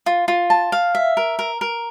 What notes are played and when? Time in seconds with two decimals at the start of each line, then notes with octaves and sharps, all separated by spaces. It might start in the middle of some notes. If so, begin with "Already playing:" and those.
0.06 F4
0.28 F4
0.50 A5
0.72 F5
0.95 E5
1.17 A#4
1.39 A#4
1.61 A#4